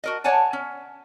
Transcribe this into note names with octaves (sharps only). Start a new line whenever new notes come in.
F#4 A#4 D#5
C#5 D5 F#5 G#5 A5
C#4